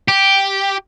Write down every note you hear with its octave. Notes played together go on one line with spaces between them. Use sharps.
G4